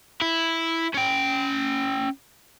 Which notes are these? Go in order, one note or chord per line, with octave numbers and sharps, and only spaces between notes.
E4
C#4 G5